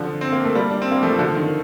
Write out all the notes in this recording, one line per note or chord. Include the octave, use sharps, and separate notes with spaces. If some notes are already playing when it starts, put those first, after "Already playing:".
Already playing: D3 F3
C4
A#3
A3
G3 A#3
D4
C4
A#3
F3 A3
D3 F3
D#3